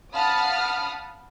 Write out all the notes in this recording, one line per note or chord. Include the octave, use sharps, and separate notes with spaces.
F5 F#5 A5 B5 D#6 F6